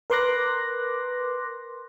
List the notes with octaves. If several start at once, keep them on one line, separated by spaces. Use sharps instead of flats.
A#4 B4 C6 D6 F#6 A#6